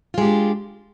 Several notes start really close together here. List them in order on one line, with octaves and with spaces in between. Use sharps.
F4 G#3 G4 D4